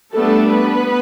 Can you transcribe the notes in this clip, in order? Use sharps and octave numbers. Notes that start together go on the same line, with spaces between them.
G3 A3 B3 D4 A4
B3 B4